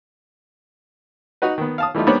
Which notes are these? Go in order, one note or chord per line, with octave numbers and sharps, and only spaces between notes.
D#4 F#4 B4
D#3 B3
F5 A5 D#6
E3 G3 A3 D#4 F4
G3 A#3 B3 D4 C5 C#5